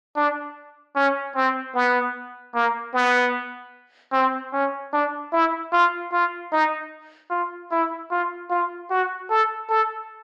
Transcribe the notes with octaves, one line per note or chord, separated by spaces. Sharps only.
D4
C#4
C4
B3
A#3
B3
C4
C#4
D4
E4
F4
F4
D#4
F4
E4
F4
F4
F#4
A4
A4